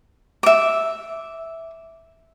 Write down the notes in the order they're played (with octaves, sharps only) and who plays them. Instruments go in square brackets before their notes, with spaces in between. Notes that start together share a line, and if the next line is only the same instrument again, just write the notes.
[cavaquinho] E5 D6